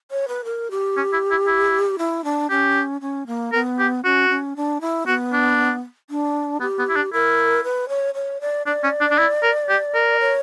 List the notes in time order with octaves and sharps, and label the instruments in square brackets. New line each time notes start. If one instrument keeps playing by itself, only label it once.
[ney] C#5
B4
A#4
G4
[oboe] C#4
E4
E4
E4
[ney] E4
D4
[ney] C#4 [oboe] G4
[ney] C#4
A#3
[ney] B3 [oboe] A#4
[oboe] G4
[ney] C#4 [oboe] F#4
[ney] C#4
D4
E4
[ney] B3 [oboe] F#4
[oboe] D4
[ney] D4
[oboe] B3 [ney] G4
[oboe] B3
E4
D4
[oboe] E4 [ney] A#4
[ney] B4
C#5
C#5
D5
[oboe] D4 [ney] D5
[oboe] C#4
D4
D4
E4
A#4
G4
A#4
[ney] C#5